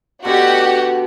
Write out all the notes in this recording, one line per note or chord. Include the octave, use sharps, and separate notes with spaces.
B2 D3 F#4 G4 F#5